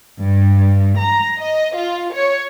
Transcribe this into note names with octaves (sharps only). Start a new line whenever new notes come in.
G2
A#5
D#5
F4
C#5